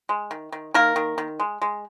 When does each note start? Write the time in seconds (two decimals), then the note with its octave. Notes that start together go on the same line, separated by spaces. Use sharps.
0.09 G#3
0.31 D#3
0.52 D#3
0.74 D#3 A#3 A#4
0.96 D#3
1.18 D#3
1.40 G#3
1.62 G#3